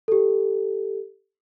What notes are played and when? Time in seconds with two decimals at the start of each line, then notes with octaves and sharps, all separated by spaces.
0.08 G4 A4